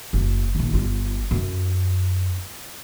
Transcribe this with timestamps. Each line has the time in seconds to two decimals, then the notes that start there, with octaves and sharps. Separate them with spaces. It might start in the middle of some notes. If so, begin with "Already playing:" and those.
0.13 F#1
0.55 A#1 D#3
0.73 G1 F4
1.31 F#2